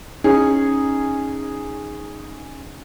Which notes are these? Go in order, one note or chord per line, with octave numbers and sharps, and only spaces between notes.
C#4 D#4 G#4